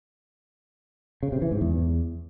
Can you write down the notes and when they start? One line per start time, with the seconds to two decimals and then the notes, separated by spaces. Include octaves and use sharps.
1.23 C#3
1.32 C3
1.42 E3
1.51 G#2
1.61 E2